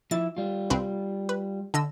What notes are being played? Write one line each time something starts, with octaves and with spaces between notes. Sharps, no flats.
F3 E4 E5 A6
G3 F4
C2 C4 B4
B4
D3 D#5 E6